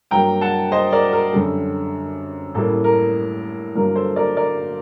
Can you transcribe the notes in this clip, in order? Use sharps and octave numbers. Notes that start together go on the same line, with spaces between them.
G2 F#3 A#3 G5 A#5
F#5 A5
C5 D#5
A#4 D5
A#4
F#2 D3 G3 A4
A1 A2 G3 A#3 A4
A#4
G1 G2 F#3 A#3 A#4
A4 C5
A#4 D5
A#4 D5